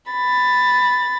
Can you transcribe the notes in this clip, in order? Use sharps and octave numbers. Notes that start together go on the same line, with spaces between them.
B5 A6